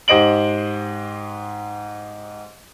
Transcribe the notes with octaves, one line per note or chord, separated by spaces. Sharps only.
G#2 G4 C5 D#5 D7 F#7